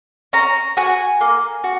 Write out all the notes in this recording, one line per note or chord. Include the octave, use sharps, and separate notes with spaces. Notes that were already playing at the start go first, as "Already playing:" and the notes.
C#4 A#5
F#4 G#5
A#3
F#4